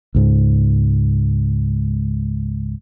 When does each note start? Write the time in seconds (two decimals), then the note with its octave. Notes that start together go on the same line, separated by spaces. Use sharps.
0.15 C#2 G#2